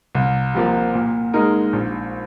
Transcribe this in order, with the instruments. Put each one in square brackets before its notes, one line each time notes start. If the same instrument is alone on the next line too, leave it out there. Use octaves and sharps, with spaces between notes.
[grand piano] C2
C3 F3 A#3
A#2
G#3 D#4 A#4
A#1